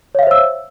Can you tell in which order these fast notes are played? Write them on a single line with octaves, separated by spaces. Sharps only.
C#5 F5 E5 C5 E6